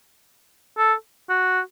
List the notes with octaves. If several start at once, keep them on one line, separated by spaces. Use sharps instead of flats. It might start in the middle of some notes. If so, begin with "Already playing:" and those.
A4
F#4